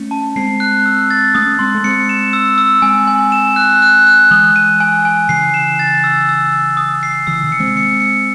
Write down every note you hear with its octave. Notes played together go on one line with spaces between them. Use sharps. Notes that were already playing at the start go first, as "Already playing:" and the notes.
Already playing: A3 C#4
A5
G#3 C4 C7
F#6
E6
A6
A3 C#4 D#6
G#3 C4 C6
A3
G#3 C4 C#7
E7
E6
E6
G#3 C4 G#5
G#5
E7
F#6
F#6
F#6
E3 G#3 D#6
D#7
G#5
G#5
C#3 E3 C7
E7
A6
E6
E6
E6
D#6
C7
C#3 E3 E6
C3 D#3
C#7
G#3 C4
C#7
C#7